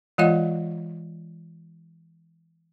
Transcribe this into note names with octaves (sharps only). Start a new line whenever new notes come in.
E3 G#3 F4 C#5 D#5 F#5